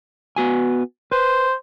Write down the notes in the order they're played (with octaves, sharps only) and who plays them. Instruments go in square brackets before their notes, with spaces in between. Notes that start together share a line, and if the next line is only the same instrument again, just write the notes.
[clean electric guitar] B3 F#4 G#5
[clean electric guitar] B4 [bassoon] C5